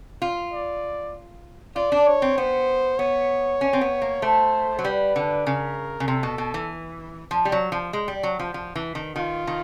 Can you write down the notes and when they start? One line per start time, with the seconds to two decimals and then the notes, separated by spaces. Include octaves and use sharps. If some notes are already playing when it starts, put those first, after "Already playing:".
0.22 F4
0.53 D5
1.76 F4 D5
1.92 D4
2.07 C#5
2.22 C4
2.38 B3 C5
2.99 B3 C#5
3.61 C#4
3.73 C4
3.81 B3
4.02 A#3
4.22 A3 C5
4.79 F#3
4.84 G3 B4
5.16 D3
5.46 C#3 A#4
6.00 C#3
6.07 C3 A4
6.23 B2
6.38 B2
6.54 E3
7.31 F3
7.45 G3
7.52 F#3
7.72 F3
7.93 G#3
8.08 G3
8.23 F#3
8.39 F3
8.54 F3
8.75 E3
8.95 D#3
9.16 D#3 F4
9.47 D#3